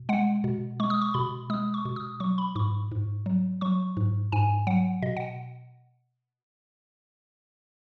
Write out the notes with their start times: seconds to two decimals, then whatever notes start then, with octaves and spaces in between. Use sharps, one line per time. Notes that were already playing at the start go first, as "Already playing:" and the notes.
Already playing: B2
0.09 G#3 F#5
0.44 B2
0.80 G#3 C#6
0.90 D#6
1.01 C#6
1.14 B2 B5
1.50 G#3 D#6
1.74 C#6
1.85 B2
1.96 D#6
2.20 F#3 C#6
2.38 B5
2.55 G#2 C#6
2.91 G#2
3.26 F#3
3.61 F#3 C#6
3.97 G#2
4.32 G#2 G#5
4.67 F#3 F#5
5.02 B2 D#5
5.17 F#5